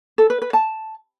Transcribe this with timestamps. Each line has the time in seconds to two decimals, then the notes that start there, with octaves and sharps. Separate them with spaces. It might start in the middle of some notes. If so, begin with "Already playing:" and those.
0.18 A4
0.30 B4
0.42 B4
0.53 A5